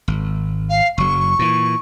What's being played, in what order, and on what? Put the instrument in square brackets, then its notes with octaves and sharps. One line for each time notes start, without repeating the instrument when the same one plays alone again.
[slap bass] G#1
[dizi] F5
[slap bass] F#1 F#3 [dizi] C#6
[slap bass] A#2 E3